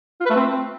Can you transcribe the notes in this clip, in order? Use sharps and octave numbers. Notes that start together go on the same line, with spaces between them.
F4
B4
A3
C4